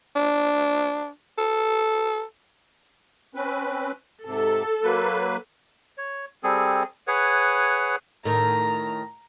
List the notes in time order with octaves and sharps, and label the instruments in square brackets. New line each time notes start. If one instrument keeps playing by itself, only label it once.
[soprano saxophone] D4
A4
[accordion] C4 C#4 B4
[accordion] G#2 C3 [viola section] A4
[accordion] F#3 A#3 B4
[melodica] C#5
G3 C4 G#4 A4
G#4 B4 C#5 F#5
[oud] A2 D#3 [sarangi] A#5